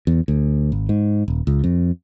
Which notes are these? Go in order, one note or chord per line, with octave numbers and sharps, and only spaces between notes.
E2
D2
G#1
G#2
D#1
C#2
F2